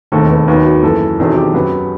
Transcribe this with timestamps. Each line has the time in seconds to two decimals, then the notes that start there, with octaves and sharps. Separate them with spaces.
0.12 E1 D#2 D#3 A3 C4 A4
0.30 B4
0.48 D#2 D#3 F#3 B3 B4
0.65 F#4
0.83 F#1 F#2 E3 A4
1.18 E1 E2 D#3 F#3 C4 A4
1.36 G4
1.54 F#2 F#3 B3